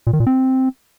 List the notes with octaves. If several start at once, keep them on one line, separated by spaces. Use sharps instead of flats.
A#2
D#3
A#2
C4